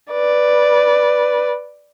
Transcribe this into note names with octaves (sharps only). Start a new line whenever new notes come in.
B4 D5